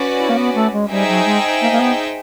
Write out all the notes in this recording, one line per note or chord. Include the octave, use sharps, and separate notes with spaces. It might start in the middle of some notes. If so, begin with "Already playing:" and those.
Already playing: C#4 F#4 B4 D5
E4
A#3
B3
A3
G#3
G3 D#4 G#4 C5 E5 G5
F#3
G#3
A#3
A#3
B3